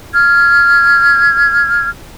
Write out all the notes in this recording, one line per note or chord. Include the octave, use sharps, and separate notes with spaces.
F6 G#6